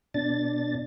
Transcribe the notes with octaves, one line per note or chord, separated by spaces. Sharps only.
B2 D4 A6